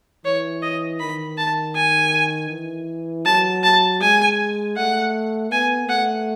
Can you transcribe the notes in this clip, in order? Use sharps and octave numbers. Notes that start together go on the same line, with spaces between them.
E3 C#5
D#5
D#3 B5
A5
G#5
E3
F#3 A5
A5
G#3 G#5
A3 F#5
B3 G#5
A3 F#5